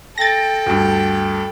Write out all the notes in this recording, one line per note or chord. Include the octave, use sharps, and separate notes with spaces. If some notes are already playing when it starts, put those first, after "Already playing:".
A4 G5 A6 A#6
D2 G2